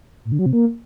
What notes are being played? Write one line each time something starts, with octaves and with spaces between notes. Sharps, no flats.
A2
D3
F#3
C3
A#3